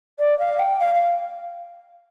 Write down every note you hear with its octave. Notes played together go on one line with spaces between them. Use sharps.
D5
F5
G5
F5
F5